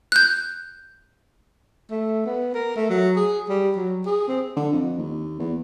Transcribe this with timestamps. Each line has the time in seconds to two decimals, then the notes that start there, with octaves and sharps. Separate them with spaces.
0.12 F#6 G6
1.91 A3
2.26 B3
2.54 A#4
2.76 A3
2.90 F#3
3.16 G#4
3.49 G3
3.76 F#3
4.06 G#4
4.28 C4
4.57 D3
4.73 F2
4.99 D#2
5.39 E2